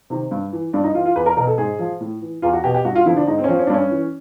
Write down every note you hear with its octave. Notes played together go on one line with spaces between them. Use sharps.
C3 D#3
G2
E3
G2 D4
D#4
E3 F4
F4
E2 B4
A#4
B2 A#4
A4
G#2 G#4
F3
A2
E3
E2 F4
F#4
B2 G4
G4
G2 F#4
F4
D3 F3 E4
D4
G#2 D#4
C4
C#4
F3 C4
C#4
D4
G2 C#4
E3